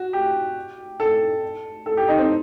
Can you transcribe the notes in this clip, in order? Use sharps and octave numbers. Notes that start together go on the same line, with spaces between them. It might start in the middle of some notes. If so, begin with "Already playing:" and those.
Already playing: F#4
G4
A4
A4
G4
D#4
C4